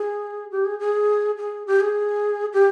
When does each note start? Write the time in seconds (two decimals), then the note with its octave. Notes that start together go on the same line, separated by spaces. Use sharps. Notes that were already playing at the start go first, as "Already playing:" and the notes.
Already playing: G#4
0.51 G4
0.65 G#4
0.79 G#4
1.38 G#4
1.67 G4
1.81 G#4
2.53 G4